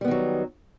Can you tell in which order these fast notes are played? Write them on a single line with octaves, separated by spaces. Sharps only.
G3 B3 D#3 F#3